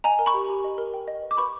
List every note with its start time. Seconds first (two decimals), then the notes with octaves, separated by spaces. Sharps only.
0.04 D#5 G#5 A#5
0.19 A#4
0.26 B5 C#6
0.34 G4
0.49 G4
0.64 D#5
0.78 A#4
0.94 G5
1.08 D#5
1.23 B4
1.31 D6
1.37 B4 B5 C#6